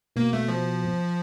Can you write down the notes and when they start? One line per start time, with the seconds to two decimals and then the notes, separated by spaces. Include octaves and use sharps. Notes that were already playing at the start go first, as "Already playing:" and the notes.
0.16 B2 A#3
0.33 A3
0.48 F3